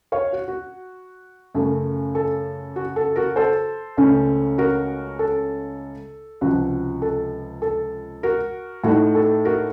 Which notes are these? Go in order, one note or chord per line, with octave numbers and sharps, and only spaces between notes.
C#5 F5
F#4
F#4
F#2 C#3 A3
A4
F#4
A4
F#4 A#4
A4 C5
C#2 C#3 A3 C#4
F#4 A#4
A4
C#2 C3 F3 F#4
A4
A4
F#4 A#4
A2 A3 D#4 F#4
A4
F#4 A#4